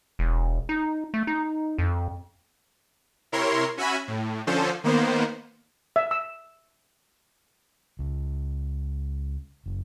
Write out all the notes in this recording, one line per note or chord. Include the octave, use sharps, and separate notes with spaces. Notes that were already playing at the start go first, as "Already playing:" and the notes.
E1
D#4
A3
D#4
F2
C3 E4 A#4 C#5 C6
C#4 F#4 E5 G#5 B5
A2
D3 F3 C#4 A4 C5
D#3 A#3 B3 C5
E5
E6
C#2
F#1